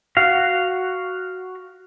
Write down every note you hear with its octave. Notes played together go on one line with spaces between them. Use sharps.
F#4 F5